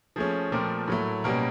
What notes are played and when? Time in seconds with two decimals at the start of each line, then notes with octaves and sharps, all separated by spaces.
0.16 F3 A3 C#4 G#4
0.52 A#2 F3 A3 C4 A#4
0.88 A2 F#3 A3
1.24 B2 G3 A#3 C#4 A#4